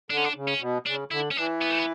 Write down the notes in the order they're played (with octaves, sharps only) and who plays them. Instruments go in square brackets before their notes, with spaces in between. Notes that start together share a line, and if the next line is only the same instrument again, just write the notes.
[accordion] D3 [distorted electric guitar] D4
[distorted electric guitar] C#4
D4
[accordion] C#3
[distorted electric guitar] C#4
[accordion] B2
[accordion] C#3 [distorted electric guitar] D4
[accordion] D3 [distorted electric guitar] E4
[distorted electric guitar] C#4
[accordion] E3 [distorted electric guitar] D4
[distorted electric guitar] B3
A3
B3